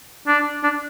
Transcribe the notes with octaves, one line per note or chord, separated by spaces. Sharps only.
D4
D4